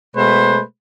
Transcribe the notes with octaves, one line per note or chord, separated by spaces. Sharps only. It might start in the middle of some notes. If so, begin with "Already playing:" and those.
B2 G#3 A3 B4 C5